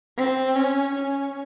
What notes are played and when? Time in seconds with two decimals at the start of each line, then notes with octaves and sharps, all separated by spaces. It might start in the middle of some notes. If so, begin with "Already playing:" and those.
0.18 C4
0.56 C#4
0.95 C#4